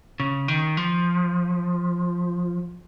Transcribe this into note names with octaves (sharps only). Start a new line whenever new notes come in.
C#3
D#3
F3